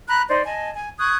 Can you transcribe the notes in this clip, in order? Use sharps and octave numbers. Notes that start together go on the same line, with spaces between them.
A#5 B5 F#6
D#4 C5 D5
D#5 G#5 A5
G#5
C#6 D#6 F#6 G#6